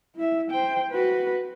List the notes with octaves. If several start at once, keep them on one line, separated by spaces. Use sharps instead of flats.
E4 E5
C5 G5
F#4 B4